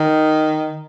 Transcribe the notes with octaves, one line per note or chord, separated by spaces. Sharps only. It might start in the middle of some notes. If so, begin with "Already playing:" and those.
Already playing: D#3